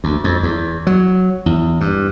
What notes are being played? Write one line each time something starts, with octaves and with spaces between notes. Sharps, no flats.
D2
F2
E2
F#3
E2
G2